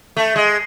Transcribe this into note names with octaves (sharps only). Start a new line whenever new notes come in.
A3
G#3